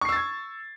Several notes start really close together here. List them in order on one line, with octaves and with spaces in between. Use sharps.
C#6 C7 E6 A6 G#6